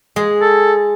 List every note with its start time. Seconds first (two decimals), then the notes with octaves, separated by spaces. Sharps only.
0.16 G#3 G#4
0.41 A4